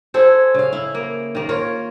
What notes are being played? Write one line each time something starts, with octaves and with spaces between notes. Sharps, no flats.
E4 G#4 A4 C5
C#3 F5
E4
A#3
D#3 A#3
F4 A#4 C#5